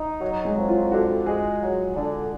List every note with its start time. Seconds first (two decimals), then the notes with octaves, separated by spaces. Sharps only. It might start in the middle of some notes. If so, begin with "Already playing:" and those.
Already playing: D#4
0.21 F#3
0.45 G#3
0.57 F2
0.68 F4
0.91 D3 F#4
1.26 G#3 G#4
1.61 F#3
1.96 D3